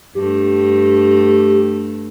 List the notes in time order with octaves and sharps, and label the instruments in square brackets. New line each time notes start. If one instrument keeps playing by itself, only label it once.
[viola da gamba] G2 A3 [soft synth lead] G4